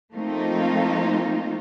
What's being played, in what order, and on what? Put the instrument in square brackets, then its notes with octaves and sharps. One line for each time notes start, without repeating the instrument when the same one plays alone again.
[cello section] F3 A3 A#3 C4 D#4 F4